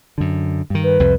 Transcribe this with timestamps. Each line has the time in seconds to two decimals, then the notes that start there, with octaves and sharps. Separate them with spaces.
0.18 F#2 D3
0.70 G2 D#3
0.83 B4
0.99 C2 F2